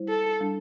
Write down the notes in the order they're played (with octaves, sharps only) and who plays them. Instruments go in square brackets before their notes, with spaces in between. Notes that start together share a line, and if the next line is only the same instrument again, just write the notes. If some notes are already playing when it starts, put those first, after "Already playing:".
Already playing: [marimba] G3 E4 C5
[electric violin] A4
[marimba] G3 D4